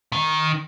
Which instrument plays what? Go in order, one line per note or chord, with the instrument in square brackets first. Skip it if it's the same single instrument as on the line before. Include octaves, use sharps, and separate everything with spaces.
[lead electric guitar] D#3